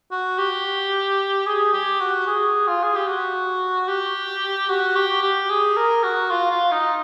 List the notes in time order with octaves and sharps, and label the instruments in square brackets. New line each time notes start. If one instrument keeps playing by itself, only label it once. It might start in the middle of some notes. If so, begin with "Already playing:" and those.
[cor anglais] F#4
G4
G#4
G4
F#4
G#4
F4
G#4
G4
F#4
G4
F#4
G4
G4
G#4
A#4
F#4
F4
F4
D#4